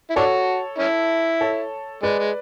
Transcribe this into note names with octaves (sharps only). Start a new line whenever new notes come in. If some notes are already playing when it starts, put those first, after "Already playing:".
E4
D4 F#4 A4 C#5
C#4 E4
A4 C#5
G#3 B4 D5
G#3